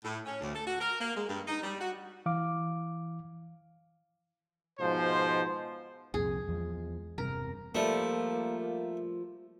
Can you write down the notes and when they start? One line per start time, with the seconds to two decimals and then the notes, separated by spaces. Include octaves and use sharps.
0.05 A2
0.26 C#4
0.41 D2
0.55 A4
0.66 F#4
0.81 A#4
1.01 A#3
1.16 G#3
1.29 G2
1.48 D#4
1.63 G3
1.81 F#4
2.26 E3 F5 D6
4.79 G#2 B2 F3 C5
6.14 C2 F2 A#2 G#4
6.48 E2 F3 G#3
7.18 E1 G2 C3 A#4
7.75 F3 G3 A3 A#3